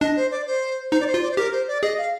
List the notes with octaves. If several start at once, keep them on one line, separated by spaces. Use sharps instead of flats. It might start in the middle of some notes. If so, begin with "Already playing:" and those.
D4 D#5
C5
D5
C5
D#4 C5
D5
C5
F4
D5
C5
G4 A#4
C5
D5
G#4 D#5
F5